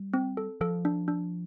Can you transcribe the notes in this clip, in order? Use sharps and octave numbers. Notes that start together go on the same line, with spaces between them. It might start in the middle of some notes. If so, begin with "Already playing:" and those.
Already playing: G3
C4
A4
F3 A4
D4
D4